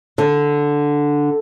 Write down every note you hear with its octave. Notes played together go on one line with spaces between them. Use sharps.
D3